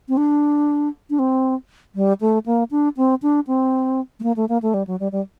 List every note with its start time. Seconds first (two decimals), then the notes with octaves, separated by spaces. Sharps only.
0.09 C4
0.17 D4
1.10 D4
1.19 C4
1.95 G3
2.21 A3
2.46 A#3
2.71 D4
2.97 C4
3.22 D4
3.47 C4
4.20 A3
4.23 A#3
4.36 A3
4.49 A#3
4.62 A3
4.74 G3
4.87 F#3
5.00 G3
5.12 G3